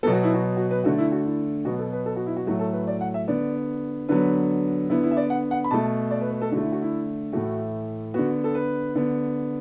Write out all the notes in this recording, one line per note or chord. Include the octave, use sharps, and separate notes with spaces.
B2 F#3 B3 A4
F#4
E4
F#4
F#4
B4
D3 A3 F#4
E4
F#4
E4
B2 F#3 B3 F#4
A4
B4
A4
F#4
E4
F#4
A2 F#3 A3 F#4
A4
B4
D5
F#5
E5
D3 B3 D5
D3 F#3 B3 B4
D3 B3 E4
E4
E5
D5
F#5
F#5
B5
B2 A3 A5
D5
B4
B4
A4
D3 F#4
A3
E4
F#4
E4
A2 E3 A3 F#4
D3 B3 F#4
A4
B4
D3 B3